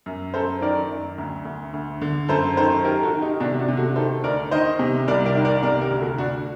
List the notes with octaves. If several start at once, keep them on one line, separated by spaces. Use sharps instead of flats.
F#2
F#2 A4 C5
D#3 A#4 D5
F#2
D2
D2
D2
D3
F#2 A4 C5
D#3 A4 C5
D#3 G4 A#4
F#4 A4
D#3
D#4 G4
C3 D4 F#4
D4 F#4
C3
F#4 A4
D#3 A4 C5
D2 A#4 D5
D#3 C5 D#5
C3
C2 A#4 D5
A#4 D5
D#3
A#4 D5
C3 A#4 D5
G4 A#4
D2
F#4 A4
D2 D4 F#4